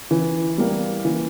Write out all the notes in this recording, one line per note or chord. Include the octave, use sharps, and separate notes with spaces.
E3
G3 A#3
E3